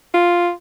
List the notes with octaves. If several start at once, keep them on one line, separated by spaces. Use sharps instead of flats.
F4